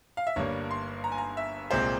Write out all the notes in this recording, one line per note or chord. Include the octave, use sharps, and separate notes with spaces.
F5
E5
G1 G2 G3 A#3 C#5
C6
A#5
G#5
A#5
E5
C2 A#2 G#3 C4 C5